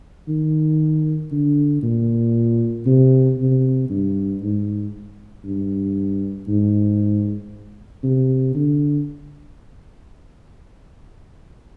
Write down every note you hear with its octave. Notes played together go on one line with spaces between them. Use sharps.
D#3
D3
A#2
C3
C3
G2
G#2
G2
G#2
C3
D3